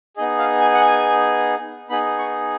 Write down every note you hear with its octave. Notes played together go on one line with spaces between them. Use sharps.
B3 D#4 G#4 D#5
F5
G#5
F#5
G#5
B3 D#4 G#4 B5
C#6